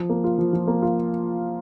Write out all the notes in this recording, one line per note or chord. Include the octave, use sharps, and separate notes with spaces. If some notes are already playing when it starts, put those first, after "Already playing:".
Already playing: F3
A#3
F4
F3
F3
A#3
F4